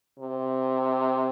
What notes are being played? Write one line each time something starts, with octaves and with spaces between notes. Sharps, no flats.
C3